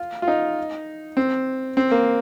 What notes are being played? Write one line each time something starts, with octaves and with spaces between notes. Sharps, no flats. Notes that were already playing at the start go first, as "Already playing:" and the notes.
Already playing: F4
F4
D#4
C4
C4
A#3